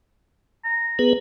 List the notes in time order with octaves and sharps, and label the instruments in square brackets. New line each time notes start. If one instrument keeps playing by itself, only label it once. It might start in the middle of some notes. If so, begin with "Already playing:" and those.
[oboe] A#5
[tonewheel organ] B3 G#4 B4